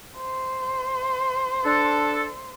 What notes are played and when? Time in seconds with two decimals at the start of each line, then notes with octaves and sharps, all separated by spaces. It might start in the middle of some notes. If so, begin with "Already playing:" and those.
0.18 C5
1.65 D4 A4